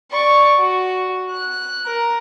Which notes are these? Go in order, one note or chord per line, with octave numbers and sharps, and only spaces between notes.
D5 C#6
F#4
F#6
A#4